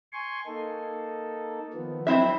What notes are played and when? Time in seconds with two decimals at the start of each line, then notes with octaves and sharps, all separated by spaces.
0.13 G#5 C6 C#6
0.46 A#3 D#4 A4
1.74 D#3 F3 B3
2.07 F#3 C4 D#4 E4 E5